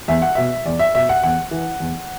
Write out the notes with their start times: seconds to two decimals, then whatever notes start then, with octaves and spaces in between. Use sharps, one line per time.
0.08 E2 E5
0.22 F#5
0.35 B2 E5
0.66 E2 D5
0.79 E5
0.94 B2 E5
1.09 F#5
1.23 E2 F#5
1.51 E3
1.80 E2